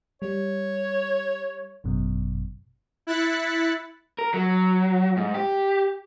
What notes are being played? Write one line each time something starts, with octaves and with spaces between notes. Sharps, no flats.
G3 C#5
G#1 F#2 B2
E4 F#6 A6 B6 C#7
A#4
F#3
G#2
G4